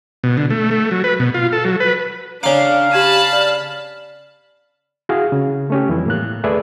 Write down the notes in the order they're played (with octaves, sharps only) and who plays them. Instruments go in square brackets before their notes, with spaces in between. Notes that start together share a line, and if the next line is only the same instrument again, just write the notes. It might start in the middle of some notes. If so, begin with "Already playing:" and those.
[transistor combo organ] B2
D3
A3
A3
F#3
B4
B2
F4
A4
F#3
B4
[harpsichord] C#3 D6 [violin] D4 [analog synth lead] F5 [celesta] A#5
[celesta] G4 G#6 D#7 [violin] A5 B5
[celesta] D5
[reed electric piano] E4 F#4 G#4 F5
C#3
A3 C#4 G4
F2 E3 G3 E4
A2 A#3 F#6
D#2 A3 G#4 B4 D5 E5